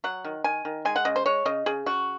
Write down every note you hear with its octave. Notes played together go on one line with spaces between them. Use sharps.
F#3 F#5
D#3
D#3 G#5
D#3
G#3 G#5
F#5
C#3 D#5
C5
G#3 C#5
C#3 D#5
C#3 G#4
C#3 F#4